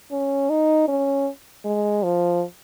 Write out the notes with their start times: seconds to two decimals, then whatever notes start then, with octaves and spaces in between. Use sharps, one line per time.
0.12 C#4
0.50 D#4
0.88 C#4
1.65 G#3
2.03 F3